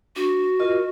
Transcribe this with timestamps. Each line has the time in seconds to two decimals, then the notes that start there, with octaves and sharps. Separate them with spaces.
0.16 D4 F#4
0.60 F4 A#4 D#5